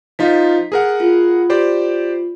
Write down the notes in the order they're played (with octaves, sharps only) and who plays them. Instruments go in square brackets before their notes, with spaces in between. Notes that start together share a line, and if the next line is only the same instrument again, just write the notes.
[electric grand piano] F3 D#4 F4 [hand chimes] B6
[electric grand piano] G#4 A#4 F#5
[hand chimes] F4
[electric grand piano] G4 C5 D5